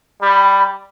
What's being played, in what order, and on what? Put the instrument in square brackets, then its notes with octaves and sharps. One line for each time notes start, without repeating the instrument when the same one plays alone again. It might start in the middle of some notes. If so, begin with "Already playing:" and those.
[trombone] G3 [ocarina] B5